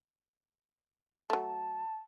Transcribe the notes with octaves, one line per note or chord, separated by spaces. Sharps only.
F#3 A3 A5